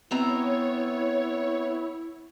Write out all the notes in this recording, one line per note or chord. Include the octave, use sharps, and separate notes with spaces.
B3 C4 E4 C#5 A#5